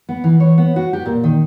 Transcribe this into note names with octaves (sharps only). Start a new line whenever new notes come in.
B3
E3
C#5
B3
F#4
G4
A#2
D#3